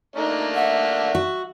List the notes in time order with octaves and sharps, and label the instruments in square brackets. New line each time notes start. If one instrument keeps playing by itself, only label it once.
[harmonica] A3 A#3 D4 [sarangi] D#4
[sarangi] E5 [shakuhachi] F#5
[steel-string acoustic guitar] F#4